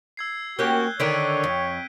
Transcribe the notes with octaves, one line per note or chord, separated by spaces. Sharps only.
E6 G#6 C7
A#3 C#4 F#4 G4 F#6 G6 G7
D3 D#3 D4 C#5 B6 D7 D#7
F2